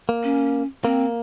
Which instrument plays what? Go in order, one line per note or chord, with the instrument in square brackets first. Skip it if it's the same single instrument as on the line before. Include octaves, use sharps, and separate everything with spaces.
[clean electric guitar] A#3
[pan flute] C#4
[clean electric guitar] A#3 [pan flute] C4